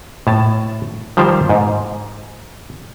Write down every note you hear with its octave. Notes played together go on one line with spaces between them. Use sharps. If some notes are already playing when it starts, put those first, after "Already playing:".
A2 A5
D#3 F3 G3 C5 F5
G#2